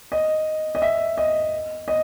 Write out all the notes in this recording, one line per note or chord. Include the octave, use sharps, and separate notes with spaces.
D#5
D#5
E5
D#5
D#5